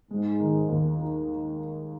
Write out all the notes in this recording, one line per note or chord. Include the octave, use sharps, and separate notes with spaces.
G#2 G#3
D#3
D#2
D#4